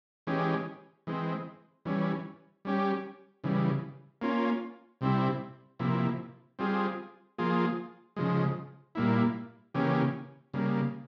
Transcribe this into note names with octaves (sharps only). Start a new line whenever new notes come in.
E3 G#3 C#4 G4
E3 G#3 C4
E3 G3 C#4
G3 C#4 G4
C#3 E3 G3
A#3 C#4 F4
C3 G3 C4 E4
C3 F3 A#3 E4
G3 C4 F4 G#4
F3 A#3 F4 G#4
C#3 F3 G#3
A#2 G3 A#3 E4
C#3 E3 A#3 C#4 G4
C#3 G3 A#3